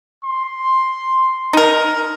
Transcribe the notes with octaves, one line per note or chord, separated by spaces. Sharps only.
C6
D#4 A#4